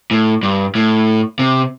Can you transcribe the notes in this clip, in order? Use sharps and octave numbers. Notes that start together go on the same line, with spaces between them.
A2
G2
A2
C3